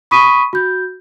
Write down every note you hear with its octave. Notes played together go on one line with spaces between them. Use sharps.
B5 C#6 D#6 B6 D#7
F#4 G6